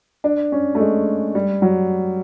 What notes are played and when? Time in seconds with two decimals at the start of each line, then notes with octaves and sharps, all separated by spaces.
0.24 D4
0.52 C#4
0.75 A3
0.80 G#3
1.35 G3
1.62 F#3